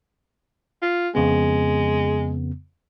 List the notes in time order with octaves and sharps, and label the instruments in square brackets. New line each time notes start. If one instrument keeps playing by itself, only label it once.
[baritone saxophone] F4
[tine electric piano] F2 C#3 B3 [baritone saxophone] G#3